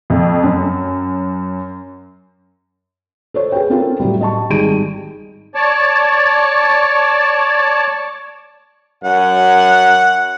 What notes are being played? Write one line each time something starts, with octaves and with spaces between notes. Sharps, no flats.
F2
F#2
A4 C5 C#5
G#4 B4 G5
C4 C#4 F4 A4 A#4 C5
A2 F#3 G3
D#5 A5 C#6
G#1 G3 D#4 G#4 D7 D#7
C#5 D5 A5
F#2 F#5